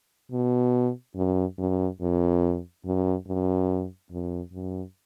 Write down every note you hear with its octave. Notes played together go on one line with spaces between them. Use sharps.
B2
F#2
F#2
F2
F#2
F#2
F2
F#2